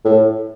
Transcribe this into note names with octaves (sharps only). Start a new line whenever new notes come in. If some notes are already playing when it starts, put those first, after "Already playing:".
A2